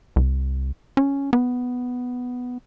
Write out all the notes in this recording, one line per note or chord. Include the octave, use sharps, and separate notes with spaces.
C2
C#4
B3